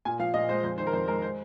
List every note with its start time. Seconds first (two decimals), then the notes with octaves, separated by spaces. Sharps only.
0.05 A#2 G#5
0.19 F3 F5
0.34 A#2 D#5
0.49 G#3 C5
0.63 F2 C5
0.78 D#3 C5
0.87 A#4
0.93 F2 C5
1.07 G#3 A#4
1.22 C5